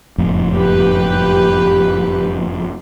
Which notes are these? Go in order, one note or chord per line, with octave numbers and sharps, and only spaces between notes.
F#1 F2 A2
G4 B4